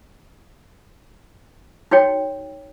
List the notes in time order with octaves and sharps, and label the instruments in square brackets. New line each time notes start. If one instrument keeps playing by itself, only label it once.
[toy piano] D#4 F#4 C#5 G5